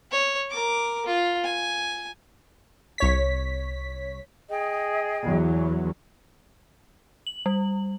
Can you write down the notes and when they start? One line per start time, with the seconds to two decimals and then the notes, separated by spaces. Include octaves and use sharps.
0.11 C#5
0.51 A#4 D6
1.06 F4
1.44 G#5
2.98 C2 C#5 B6
4.50 G#4 D#5 G5
5.24 E2 E3 F#3
7.27 F#7
7.46 G3